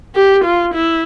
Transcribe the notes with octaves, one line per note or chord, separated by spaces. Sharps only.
G4
F4
E4